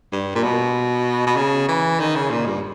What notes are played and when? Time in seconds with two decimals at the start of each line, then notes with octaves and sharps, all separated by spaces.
0.12 G2
0.35 A#2
0.43 B2
1.26 B2
1.36 C#3
1.68 E3
2.00 D#3
2.15 C#3
2.30 A#2
2.46 G2